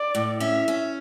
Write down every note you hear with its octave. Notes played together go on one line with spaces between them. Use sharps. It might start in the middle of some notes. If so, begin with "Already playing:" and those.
Already playing: D5
A2
C#4 E5
C#4